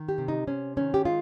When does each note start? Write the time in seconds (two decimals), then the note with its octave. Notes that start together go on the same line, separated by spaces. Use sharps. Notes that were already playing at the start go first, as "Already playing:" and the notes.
Already playing: D#3
0.09 G4
0.18 C3
0.28 D#4
0.47 C3 C#4
0.77 D#3 C#4
0.94 G4
1.05 G#3 F4